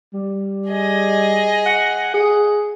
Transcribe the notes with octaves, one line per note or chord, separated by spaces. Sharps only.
G3
G#4 D#5
F#5
G#4